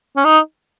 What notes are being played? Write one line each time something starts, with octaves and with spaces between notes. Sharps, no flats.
C#4
D#4